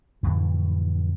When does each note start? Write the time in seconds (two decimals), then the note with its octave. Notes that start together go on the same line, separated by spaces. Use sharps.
0.23 F2 A2 D3 E3